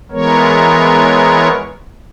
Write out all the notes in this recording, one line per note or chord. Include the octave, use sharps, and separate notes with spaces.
E3 G#3 B3 A#4 C#5